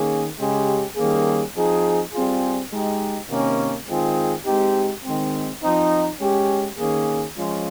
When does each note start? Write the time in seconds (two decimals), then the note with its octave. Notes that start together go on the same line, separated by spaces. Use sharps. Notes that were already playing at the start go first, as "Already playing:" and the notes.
Already playing: D#3 A#3 C#4 G#4
0.38 C#3 G#3 C#4 G4
0.96 D#3 G3 A#3 C#4 G#4
1.55 F3 C4 D#4 G#4
2.13 G3 C4 F4 G#4
2.71 G#3 D#4 G4
3.29 C3 D#3 A#3 C#4
3.87 D#3 G#3 C4 F4 G#4
4.45 G#3 C4 D#4 G4
5.03 D#3 G#3 C4
5.62 F3 C4 D#4
6.20 G#3 C#4 G4
6.78 D#3 A#3 C#4 G#4
7.36 F3 G#3 C#4 F4